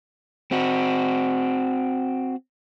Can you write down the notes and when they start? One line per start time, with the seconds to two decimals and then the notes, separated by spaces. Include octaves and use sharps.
0.52 C4 F#4